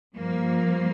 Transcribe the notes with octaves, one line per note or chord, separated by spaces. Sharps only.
G2 F3 A#3